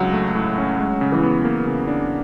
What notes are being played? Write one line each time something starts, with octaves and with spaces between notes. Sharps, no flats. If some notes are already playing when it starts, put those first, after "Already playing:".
Already playing: C#2 F#3
A3
A2
C#4
G#3
C#3
E3
B3
A#3
C#3
D4